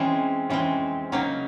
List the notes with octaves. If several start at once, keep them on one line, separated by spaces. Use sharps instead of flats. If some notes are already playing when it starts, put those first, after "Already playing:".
Already playing: E3 G#3 C4 C#4
E3 G#3 C4 C#4
C#3 F#3 A#3 C#4 D#4